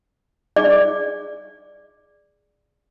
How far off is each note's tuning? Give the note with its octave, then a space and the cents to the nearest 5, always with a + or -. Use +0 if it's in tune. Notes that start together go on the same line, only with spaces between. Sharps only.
G#4 +0 D5 +10